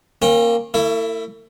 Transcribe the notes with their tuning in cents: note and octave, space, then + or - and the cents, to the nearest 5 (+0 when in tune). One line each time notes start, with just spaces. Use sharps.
A#3 +0 C#4 -40 G5 +0
A3 +45 E4 +5